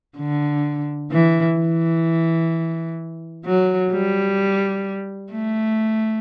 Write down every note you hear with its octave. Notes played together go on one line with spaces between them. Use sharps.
D3
E3
E3
F#3
G3
A3